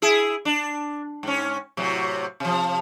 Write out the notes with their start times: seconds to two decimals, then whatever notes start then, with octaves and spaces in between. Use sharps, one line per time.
0.02 E4 G#4
0.45 D4
1.23 G#2 C#4
1.77 A2 C3 F#3
2.40 C3 F3